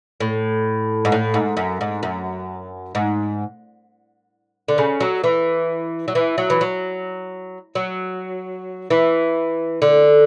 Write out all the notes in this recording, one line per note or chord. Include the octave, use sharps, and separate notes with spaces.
A2
G#2
A2
G#2
F#2
G#2
F#2
G#2
D3
C#3
F#3
E3
F#3
E3
F#3
E3
F#3
F#3
E3
D3